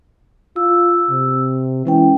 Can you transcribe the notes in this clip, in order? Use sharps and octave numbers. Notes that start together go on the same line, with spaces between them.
F4 E6
C3
E3 G#3 C#4 G5